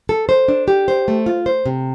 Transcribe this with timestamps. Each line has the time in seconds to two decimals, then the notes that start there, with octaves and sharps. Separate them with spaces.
0.09 A4
0.29 C5
0.48 D4
0.68 G4
0.88 C5
1.08 A3
1.26 F4
1.46 C5
1.66 C3